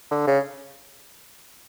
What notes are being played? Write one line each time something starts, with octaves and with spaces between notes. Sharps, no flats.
D3
C#3